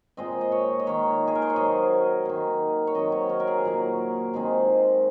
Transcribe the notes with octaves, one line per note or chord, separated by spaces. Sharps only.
A#2 G#3 C4 D#5
D#5
C#5
D#5
D#3 A#3 C#5
G#4
A#4
C5
C#5
C3 F#3 C4 D#5
D#3 A#3
C#5
D#3 F#3 C4 D#5
C#5
A#4
A#4
G#4
A#2 F#3 A#3
C3 D#3 G#3 C4